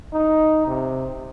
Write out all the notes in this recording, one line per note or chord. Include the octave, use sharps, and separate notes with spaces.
D#4
C3